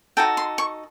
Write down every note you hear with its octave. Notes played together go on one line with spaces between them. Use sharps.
D#4 F#4 A4 G5
C6
C#6